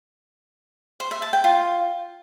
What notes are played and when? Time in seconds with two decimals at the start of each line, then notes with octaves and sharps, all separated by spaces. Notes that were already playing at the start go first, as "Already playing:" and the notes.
1.00 C5
1.11 E5
1.22 A5
1.33 G5
1.44 F4